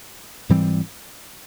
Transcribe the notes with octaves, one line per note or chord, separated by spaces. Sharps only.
G#2 E3 G3 C4